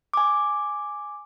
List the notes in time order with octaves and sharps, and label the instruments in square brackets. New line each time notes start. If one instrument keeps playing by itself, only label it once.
[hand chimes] G#5 D6